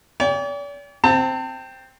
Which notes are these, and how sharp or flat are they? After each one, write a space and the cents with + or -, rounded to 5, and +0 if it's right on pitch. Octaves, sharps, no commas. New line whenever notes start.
D5 -45 G5 +30
C4 +0 A5 +35